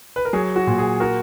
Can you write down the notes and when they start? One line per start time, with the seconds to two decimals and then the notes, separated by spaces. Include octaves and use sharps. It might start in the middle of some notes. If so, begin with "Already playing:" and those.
0.16 B4
0.25 A#4
0.33 F#3 G#4
0.56 F#4
0.67 A#2
0.78 G#4
1.00 F#4 A#4